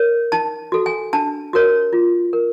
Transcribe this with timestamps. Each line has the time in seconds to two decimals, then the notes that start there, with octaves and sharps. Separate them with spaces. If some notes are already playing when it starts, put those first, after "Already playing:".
Already playing: A#4 C#5
0.32 D#4 A5
0.72 F#4 A4
0.86 G#5
1.13 D4 A5
1.53 F#4 A#4 C#5
1.93 F4
2.33 A#4